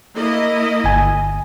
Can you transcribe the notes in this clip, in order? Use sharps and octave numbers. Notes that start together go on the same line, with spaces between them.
A#3 E4 D#5
G1 G#5